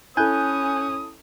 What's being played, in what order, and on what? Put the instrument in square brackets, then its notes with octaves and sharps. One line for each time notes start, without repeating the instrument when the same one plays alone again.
[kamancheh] C#4 [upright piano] E4 A4 [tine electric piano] G#5 F#6 G6 [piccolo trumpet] D#6